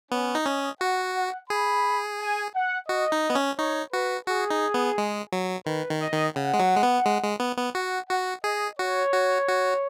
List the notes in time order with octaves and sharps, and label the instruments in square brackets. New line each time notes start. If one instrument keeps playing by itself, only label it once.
[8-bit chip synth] B3 [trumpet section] C#4
[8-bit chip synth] D#4
[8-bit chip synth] C#4 [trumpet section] D#5
[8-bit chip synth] F#4 [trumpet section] F#5
[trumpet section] F#5
[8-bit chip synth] G#4 [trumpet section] B5
[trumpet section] G#5
F#5
[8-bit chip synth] F#4 [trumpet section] D#5
[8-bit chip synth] D#4
B3
C#4
[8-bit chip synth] D#4 [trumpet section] C#5
[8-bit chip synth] F#4 [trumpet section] B4
[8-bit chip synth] F#4 [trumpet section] G#4
[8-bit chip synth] D#4
B3
G#3
F#3
[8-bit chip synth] D#3 [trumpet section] B4
[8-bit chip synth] D#3
[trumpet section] D#5
[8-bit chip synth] D#3
[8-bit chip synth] C#3 [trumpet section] F#5
[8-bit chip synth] G#3
F#3
G#3
B3
G#3
G#3
B3
B3
[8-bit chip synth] F#4 [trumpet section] F#5
[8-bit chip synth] F#4 [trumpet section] F#5
[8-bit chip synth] G#4 [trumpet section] D#5
[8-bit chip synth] F#4 [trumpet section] C#5
[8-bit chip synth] F#4
F#4